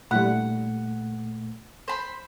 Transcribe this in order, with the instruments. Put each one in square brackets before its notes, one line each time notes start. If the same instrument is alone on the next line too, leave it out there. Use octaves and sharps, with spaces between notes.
[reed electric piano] A#2 A3 [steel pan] G3 E4 B5 [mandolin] F#5
[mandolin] C5 B5